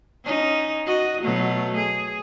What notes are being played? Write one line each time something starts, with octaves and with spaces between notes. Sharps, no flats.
C#4 D#4
F#4 D#5
B2 F#3 A3
G#4